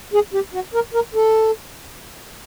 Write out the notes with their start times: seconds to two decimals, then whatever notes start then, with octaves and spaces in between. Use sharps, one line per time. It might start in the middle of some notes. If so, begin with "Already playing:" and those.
0.13 G#4
0.34 G4
0.54 F#4
0.74 A#4
0.94 A#4
1.15 A4